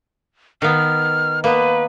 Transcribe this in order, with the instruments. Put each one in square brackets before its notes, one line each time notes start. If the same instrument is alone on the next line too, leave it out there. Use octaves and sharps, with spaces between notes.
[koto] D#3 B3 [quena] F6
[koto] A#3 B3 [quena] B4